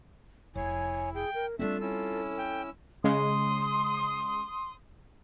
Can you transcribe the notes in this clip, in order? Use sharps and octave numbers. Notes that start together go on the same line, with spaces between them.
F1 E4 C#5 G#5
G#4 G5
A#4
G3 A3 B3 C4 D4 F4 A4 E5
C#4 E4 E6
G5
C#3 G#3 C6 D#6